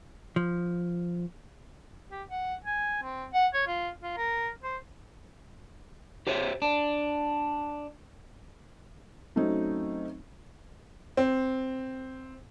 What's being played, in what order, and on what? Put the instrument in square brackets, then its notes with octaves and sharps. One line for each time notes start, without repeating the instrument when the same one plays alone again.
[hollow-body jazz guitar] F3
[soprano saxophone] G4
F#5
G#5
C4
F#5
C#5
F4
F4
A#4
C5
[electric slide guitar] G4 C5 C#5 E5
D4
[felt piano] F#3 A3 C4 C#4 D#4
[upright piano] C4